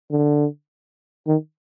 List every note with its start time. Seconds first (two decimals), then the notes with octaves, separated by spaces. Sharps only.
0.11 D3
1.27 D#3